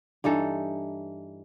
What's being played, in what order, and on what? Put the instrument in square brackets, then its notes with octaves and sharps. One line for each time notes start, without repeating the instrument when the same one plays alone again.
[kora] G2 E3 D#4 A4